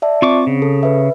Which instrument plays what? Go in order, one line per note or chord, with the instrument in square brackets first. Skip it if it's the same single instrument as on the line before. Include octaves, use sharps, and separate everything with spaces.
[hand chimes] D5 E5 A5
[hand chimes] C4 [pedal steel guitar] F4 C#6 D6
[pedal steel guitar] C#3
[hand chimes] A4
B4 E5